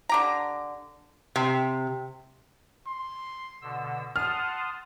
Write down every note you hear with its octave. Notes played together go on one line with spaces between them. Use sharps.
D3 G4 A#5
C3
C6
B2 D3 E6
F#5 A5 C6 D#6 F6